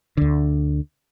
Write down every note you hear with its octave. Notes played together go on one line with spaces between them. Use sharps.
D2 D3